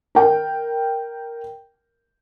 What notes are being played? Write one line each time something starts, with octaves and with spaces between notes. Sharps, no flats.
A#4 G5